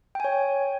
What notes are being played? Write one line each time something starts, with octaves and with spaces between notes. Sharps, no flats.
C#5 G5 G#5